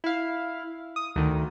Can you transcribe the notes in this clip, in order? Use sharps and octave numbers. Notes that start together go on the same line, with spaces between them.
E4 F5
D#6
D2 D#3